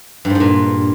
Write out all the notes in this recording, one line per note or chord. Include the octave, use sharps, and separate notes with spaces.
G2
G#2
G2
A#2